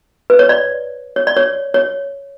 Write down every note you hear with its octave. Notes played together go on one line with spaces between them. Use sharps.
B4
C#5
D5
C#5
D5
C#5
C#5